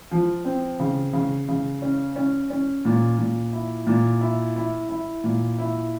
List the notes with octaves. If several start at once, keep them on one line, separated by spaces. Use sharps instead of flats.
F3
C4
C#3
C#3
C#3
C#4
C#4
C#4
A#2
A#2
E4
A#2
E4
E4
E4
A#2
E4